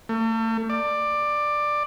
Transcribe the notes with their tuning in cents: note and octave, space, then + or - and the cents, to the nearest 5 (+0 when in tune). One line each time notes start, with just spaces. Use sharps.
A3 +40
D5 +15